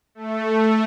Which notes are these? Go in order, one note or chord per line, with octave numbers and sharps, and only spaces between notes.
A3